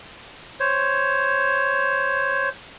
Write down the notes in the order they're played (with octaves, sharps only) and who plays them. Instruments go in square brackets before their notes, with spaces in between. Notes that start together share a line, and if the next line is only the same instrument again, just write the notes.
[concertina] C5 C#5